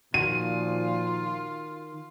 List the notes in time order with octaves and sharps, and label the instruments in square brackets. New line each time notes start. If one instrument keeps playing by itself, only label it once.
[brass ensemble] A#2 F3 [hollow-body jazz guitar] D#3 F#4 [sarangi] F4 [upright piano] D#7